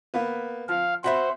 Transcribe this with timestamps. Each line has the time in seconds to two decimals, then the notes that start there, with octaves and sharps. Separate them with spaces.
0.14 A#3 B3 B4
0.69 F3 F5
1.04 C4 F#4 C5 E5 F#5 B5